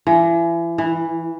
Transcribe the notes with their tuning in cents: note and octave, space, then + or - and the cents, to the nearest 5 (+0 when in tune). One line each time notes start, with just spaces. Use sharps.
E3 +35
E3 -5